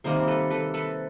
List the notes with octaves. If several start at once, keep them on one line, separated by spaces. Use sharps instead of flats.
C3 D#3 G3 A#3 A#4 C5
A4 B4
A4 B4
A4 B4